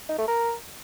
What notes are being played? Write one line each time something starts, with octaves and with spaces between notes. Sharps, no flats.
D#4
A3
A#4